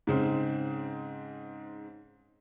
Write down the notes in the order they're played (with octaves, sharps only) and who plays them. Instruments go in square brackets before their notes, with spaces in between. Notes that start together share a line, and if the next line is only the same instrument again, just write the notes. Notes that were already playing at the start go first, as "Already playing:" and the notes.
[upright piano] G#2 C#3 C4